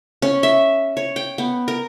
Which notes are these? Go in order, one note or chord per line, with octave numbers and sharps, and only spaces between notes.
C#4
E5
C#5
G5
B3
A#4